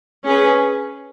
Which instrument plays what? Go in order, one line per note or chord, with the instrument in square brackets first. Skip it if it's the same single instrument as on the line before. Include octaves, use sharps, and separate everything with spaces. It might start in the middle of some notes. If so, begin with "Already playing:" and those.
[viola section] C#4 G#4 B4